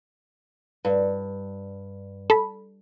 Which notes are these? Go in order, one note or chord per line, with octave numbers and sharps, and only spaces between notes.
G2
A4 B5